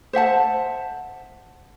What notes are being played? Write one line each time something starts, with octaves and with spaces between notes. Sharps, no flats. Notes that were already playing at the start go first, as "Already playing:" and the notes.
C5 E5 F#5 A5